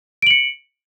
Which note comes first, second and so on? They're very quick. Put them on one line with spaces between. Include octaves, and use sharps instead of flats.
D7 F#7 C#7